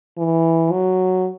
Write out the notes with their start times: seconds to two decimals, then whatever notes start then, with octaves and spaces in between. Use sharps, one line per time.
0.18 E3
0.72 F#3